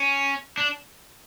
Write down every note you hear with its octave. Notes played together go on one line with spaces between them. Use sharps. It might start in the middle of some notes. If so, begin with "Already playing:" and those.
Already playing: C#4
D4